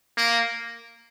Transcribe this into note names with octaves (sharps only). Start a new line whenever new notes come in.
A#3